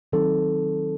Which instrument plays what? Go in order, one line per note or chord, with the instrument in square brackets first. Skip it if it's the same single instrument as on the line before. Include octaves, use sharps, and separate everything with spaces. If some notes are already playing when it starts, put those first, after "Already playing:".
[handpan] D#3 F#3 C4 D#4 [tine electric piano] A4